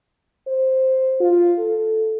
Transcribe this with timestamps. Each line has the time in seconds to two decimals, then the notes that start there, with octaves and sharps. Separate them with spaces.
0.47 C5
1.20 F4
1.59 A4